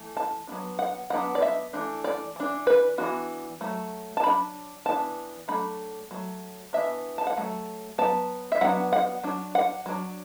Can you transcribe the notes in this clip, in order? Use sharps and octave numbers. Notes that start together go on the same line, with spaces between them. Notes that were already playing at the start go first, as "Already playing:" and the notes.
Already playing: E3 A3
A5
F#3 B3 D4
F#5
F#3 B3 D4 F#5
D5
E5
E3 A3 D4
D5
E3 D4
B4
E3 B3 D4 F#4
F#3 A3
A5
F#3 D4 B5
E3 B3 D4 A5
F#3 A3 D4 B5
F#3 A3
E3 B3 D4 E5
A5
F#5
F#3 A3
F#3 B3 A5
E5
F#3 B3 D4 F#5
F#5
F#3 D4
F#5
F#3 D4